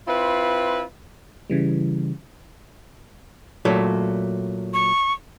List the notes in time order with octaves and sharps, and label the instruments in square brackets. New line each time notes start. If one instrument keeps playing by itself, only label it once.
[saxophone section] C4 E4 F4 B4
[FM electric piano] C#3 E3 G3
[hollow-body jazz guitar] A#2 F#3 A3
[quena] C#6